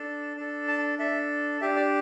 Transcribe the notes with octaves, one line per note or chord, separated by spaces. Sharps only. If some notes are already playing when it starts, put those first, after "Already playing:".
Already playing: D4 A4
D4 A4
A5
D4 A4 E5
D4 G4 E5
D5